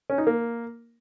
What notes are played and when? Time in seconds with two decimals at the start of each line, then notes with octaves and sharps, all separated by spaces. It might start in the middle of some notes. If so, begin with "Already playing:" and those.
0.10 C#4
0.18 D#4
0.27 A#3